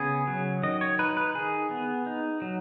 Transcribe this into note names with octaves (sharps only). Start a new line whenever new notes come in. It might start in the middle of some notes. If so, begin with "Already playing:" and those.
Already playing: C#3 B3 G#4
F#3
D#3 D#5
C#5
D#4 B4
B4
D#3 G#4
B3
D#4
F#3